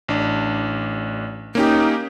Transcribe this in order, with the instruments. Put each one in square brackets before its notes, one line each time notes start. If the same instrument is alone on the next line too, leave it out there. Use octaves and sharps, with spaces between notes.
[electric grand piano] A1 D4
[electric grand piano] A#3 C#4 G4 [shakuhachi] D#4